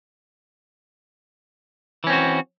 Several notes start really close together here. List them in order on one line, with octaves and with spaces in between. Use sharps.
E3 C#4 C4 F#4